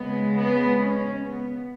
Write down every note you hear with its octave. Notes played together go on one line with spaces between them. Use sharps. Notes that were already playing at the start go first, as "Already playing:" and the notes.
Already playing: C#3 G#3 B3
B3
C#4
B3